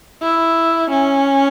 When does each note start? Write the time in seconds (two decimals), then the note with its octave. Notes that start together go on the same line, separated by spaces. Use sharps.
0.22 E4
0.90 C#4